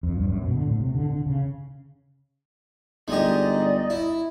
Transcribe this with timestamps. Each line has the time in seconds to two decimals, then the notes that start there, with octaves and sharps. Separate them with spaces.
0.03 F2
0.17 G2
0.29 F#2
0.42 B2
0.54 D3
0.67 A2
0.80 C3
0.95 D3
1.10 D3
1.26 C#3
3.08 G1 G#3 D#4 G4 D5 D#5
3.90 E4